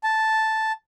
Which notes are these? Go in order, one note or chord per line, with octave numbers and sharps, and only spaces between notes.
A5